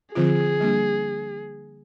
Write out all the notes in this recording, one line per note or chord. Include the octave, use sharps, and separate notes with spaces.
D3 F3 C4 F4 G#4
G3 A#3 D4